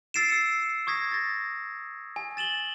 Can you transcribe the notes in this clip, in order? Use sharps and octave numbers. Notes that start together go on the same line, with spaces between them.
E6 A6 C7 D7 E7
E6 C#7
C#6 D#6 G#6 A#6 B6
A6 A#6
G#5
A6 E7 F#7 G7